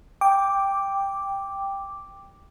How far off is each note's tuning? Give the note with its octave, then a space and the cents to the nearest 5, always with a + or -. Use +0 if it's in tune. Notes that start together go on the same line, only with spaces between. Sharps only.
G5 +10 D6 +0